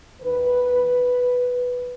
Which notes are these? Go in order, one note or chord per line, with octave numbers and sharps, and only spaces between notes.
D#2 D#3 B4